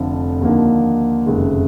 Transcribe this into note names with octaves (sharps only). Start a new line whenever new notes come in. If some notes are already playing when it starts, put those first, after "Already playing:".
Already playing: F1 F2 D3 F3
D#2 D3 F3 A#3 D#4
F#1 F2 C3 D#3 G#3